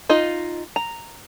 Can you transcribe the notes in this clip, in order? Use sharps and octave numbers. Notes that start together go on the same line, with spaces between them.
D#4 F4 D#5
A#5